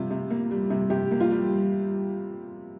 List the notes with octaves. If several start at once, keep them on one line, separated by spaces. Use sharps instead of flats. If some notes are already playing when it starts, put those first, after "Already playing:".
Already playing: C3 G3 F4
C3
A#3
G3
C3
C3 G4
A#3
F4
G3